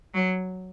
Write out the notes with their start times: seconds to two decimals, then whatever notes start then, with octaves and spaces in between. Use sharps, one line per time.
0.14 F#3